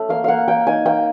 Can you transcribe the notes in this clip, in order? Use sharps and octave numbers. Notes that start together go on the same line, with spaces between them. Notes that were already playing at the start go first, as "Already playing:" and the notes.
Already playing: A3 C#4
A#3 F5
A#3 F5 F#5
A#3 G5
D#4 G#5
A#3 G5